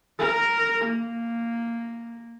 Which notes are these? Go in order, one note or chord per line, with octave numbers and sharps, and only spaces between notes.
A#4
A#3